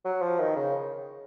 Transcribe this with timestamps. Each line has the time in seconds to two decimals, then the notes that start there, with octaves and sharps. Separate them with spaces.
0.05 F#3
0.22 F3
0.39 D#3
0.56 C#3